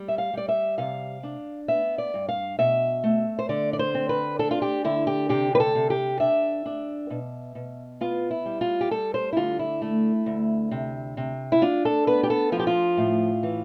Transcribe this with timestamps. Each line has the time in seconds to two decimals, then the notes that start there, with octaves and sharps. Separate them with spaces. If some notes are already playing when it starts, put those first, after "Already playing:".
Already playing: G3
0.08 E5
0.18 F5
0.33 G3 D5
0.48 E5
0.78 C3 F5
1.23 D4
1.68 B3 E5
1.98 D5
2.14 G2
2.28 F5
2.59 B2 E5
3.04 A3
3.39 C5
3.49 D3 D5
3.73 D5
3.79 C5
3.94 C4
4.09 B4
4.39 D4 A4
4.51 F4
4.62 G4
4.84 D3 E4
5.07 G4
5.29 C3 G4
5.55 B4
5.60 A4
5.75 C3
5.90 G4
6.20 D4 E5
6.66 D4
7.10 B2
7.55 B2
8.01 B3 F4
8.31 E4
8.46 G3
8.61 F4
8.81 G4
8.91 G3 A4
9.14 C5
9.33 E4
9.36 D3 F4
9.59 E4
9.82 A3
10.26 D2
10.71 C3
11.17 C3
11.52 E4
11.62 D4 F4
11.85 A4
12.07 B3 B4
12.23 G4
12.30 A4
12.52 F3 F4
12.59 G4
12.67 F4
12.97 A2
13.43 E3